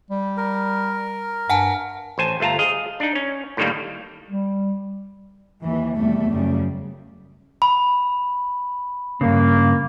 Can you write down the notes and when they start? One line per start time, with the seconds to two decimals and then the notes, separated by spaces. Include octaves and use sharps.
0.10 G3
0.37 A#4
1.50 G2 F#5 G#5 A5
2.18 A1 C5 G#5 A5
2.40 G1 A3 F4 A5 A#5
2.59 G#4 D#5 F5
3.00 D4 D#4
3.15 C#4
3.57 A2 D3 D#3 G3 A#3
4.28 G3
5.63 D#2 E3
5.97 E2 C3 G3 A3
6.29 F#2 C#3 G3
7.62 B5
9.21 G2 C#3 A#3